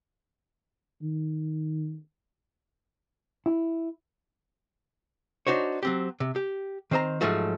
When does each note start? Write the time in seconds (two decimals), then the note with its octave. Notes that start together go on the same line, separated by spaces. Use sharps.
1.02 D#3
3.46 E4
5.47 D4 D#4 F#4 C5 C#5
5.83 F#3 C4 G4
6.20 C3
6.36 G4
6.91 D#3 C4 C5 D#5 A#5
7.21 G#2 F3 F#3 A3 F#4